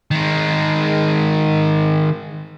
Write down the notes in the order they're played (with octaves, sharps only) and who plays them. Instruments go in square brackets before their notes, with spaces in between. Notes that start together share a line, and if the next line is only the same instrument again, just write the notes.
[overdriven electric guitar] D#3 G#3